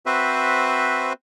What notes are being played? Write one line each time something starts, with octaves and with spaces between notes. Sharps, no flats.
C4 F#4 B4 C5 E5